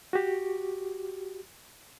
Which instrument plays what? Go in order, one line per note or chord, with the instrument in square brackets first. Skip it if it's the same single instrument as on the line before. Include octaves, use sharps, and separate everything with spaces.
[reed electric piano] F#4 G4